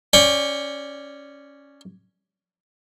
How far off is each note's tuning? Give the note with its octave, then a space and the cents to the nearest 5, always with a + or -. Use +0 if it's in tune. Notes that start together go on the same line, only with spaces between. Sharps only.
C#4 +0 D5 +0 G5 +35